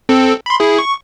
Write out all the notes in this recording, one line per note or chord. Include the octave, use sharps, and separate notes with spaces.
C4 A4
B5 C6
E4 G#4
C#6